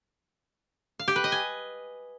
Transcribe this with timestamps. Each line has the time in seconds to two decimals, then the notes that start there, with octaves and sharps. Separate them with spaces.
0.99 F5
1.08 G4
1.16 B4
1.24 D#5
1.32 G#5